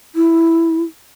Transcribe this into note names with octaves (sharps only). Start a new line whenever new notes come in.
E4